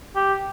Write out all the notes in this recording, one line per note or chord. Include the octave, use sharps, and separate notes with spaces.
G4